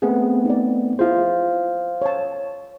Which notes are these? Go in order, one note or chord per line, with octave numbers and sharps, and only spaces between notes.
A3 B3 C4 G#4
D#4 D5
E4 F4 G#4 C5 F5
C#5 A5